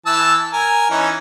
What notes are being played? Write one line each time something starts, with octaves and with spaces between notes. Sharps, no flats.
E3 A5 E6
A#4 G#5
E3 C#4 D#4